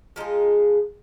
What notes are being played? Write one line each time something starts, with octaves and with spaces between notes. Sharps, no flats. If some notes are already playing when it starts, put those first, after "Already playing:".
F3 G#3 D#4 G#4